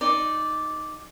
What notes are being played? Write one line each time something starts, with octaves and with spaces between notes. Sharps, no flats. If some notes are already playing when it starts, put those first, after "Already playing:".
D#4 D5